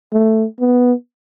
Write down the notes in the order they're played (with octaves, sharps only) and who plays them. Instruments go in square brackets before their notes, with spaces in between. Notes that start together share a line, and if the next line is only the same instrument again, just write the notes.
[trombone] A3
B3